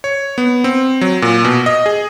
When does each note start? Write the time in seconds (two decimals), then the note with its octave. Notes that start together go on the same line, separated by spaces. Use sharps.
0.04 C#5
0.38 B3
0.64 C4
1.01 F#3
1.22 A#2
1.45 B2
1.66 D#5
1.86 G#4